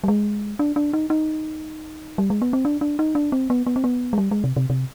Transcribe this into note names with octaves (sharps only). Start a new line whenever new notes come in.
G3
G#3
D4
D4
D#4
D#4
G3
G#3
B3
C4
D4
D4
D#4
D4
C4
B3
B3
C4
B3
G#3
G3
G#3
C3
C3
C3